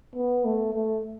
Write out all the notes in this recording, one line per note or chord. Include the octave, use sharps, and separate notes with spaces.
B3
A3
A3